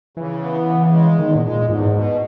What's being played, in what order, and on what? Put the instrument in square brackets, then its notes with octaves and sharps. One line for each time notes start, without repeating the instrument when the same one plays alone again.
[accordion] C#3 [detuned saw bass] E3
[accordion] B3
C#3
G#3
[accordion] E2 [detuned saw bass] D#3
[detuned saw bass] A#2
[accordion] G#3
[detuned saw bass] A#2
[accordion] E2 [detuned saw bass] G#2
[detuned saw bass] G#2
[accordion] B2